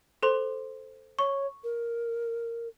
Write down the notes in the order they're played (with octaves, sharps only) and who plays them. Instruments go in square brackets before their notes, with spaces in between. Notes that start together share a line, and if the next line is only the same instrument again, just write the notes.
[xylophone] A4 C5 C6
[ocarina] C#5 [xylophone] C#6
[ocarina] A#4